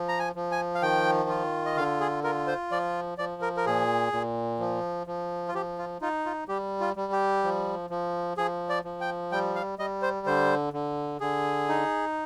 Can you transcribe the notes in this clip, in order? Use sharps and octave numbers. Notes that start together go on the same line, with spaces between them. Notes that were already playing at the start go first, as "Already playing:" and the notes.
Already playing: F3
A#5
G#5
F3
G#5
F5
D#3 G5
F4
D#5
D3 F5
G#4
F4 A#4
C5
F3 D5
F3 D5
A#4
A#4
A#2 G#4
A#2
F3
F3
F4
F3 G4
F4
D#4 F4
F4
G3 G4
F4
G3
G4
F3
F3
F3 G#4
D5
F3
G5
G3 G5
F5
G3 D#5
C5
D3 C5
D3
D3 G#4
D#4